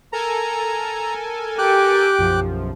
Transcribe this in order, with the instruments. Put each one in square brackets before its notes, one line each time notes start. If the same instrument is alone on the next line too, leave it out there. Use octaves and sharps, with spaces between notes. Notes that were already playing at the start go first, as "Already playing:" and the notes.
[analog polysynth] A4 A#4 G#5 [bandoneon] A#5
[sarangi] G4 [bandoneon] G5 D6 F#6
[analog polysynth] B1 F#2 F3